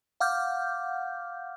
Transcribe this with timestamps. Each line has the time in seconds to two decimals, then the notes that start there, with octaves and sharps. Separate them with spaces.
0.20 F5 F#5 D6 F6 G6